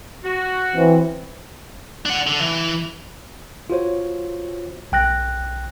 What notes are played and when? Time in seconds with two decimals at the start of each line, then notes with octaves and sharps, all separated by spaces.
0.24 F#4
0.75 E3 C4
2.06 D4 F#5
2.27 D3
2.40 E3
3.70 F4 F#4 C5 C#5
4.92 B1 G5 F#6 A#6